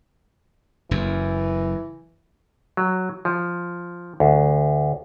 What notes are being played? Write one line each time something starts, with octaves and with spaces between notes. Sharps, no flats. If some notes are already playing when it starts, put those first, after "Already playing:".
F#1 F#2 E3
F#3
F3
D2